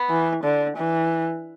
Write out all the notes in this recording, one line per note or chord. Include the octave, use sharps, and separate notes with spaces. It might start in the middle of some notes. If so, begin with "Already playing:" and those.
Already playing: B3
E3
D3
E3